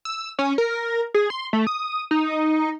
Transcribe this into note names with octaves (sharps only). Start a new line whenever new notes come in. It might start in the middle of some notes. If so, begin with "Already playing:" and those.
E6
C#4
A#4
G#4
C6
A3
D#6
D#4